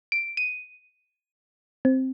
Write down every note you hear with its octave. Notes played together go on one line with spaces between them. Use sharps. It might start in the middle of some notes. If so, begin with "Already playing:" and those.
D7
D#7
C4